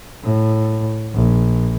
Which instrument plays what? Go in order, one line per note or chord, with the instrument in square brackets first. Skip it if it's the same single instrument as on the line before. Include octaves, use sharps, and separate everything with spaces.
[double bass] A2
A#1